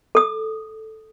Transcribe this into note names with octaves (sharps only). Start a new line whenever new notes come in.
A4 D#6